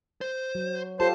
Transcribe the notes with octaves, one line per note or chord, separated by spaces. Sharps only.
C5
F#3
F4 G4 A4 C5 A5